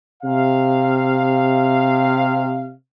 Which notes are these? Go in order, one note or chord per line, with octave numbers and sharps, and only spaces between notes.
C3 F5